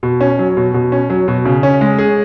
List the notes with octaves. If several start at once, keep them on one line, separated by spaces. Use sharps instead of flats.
B2
C#4
F#3
B2
B2
C#4
F#3
B2
C#3
C#4
G#3
G#4